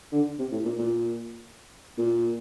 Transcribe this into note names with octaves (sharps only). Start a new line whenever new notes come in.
D3
C3
A2
A#2
A#2
A#2